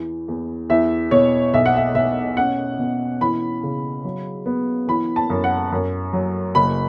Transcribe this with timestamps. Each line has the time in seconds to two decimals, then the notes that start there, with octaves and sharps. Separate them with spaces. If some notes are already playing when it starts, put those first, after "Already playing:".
Already playing: E2 E3
0.28 E2
0.70 E2 E5
1.11 B2 C#5
1.54 B1 E5
1.66 F#5
1.77 E5
1.95 B2 E5
2.37 C#4 F#5
2.79 B2
3.21 E3 B5
3.63 C#3
4.05 F#3
4.46 B3
4.88 E3 B5
5.16 A5
5.30 F#2
5.44 F#5
5.72 F#2
6.13 F#3
6.55 F#1 B5